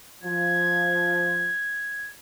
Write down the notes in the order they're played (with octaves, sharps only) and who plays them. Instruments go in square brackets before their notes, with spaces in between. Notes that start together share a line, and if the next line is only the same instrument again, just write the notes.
[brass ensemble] F3 [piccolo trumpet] G#6